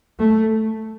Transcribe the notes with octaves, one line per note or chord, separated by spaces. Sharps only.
A3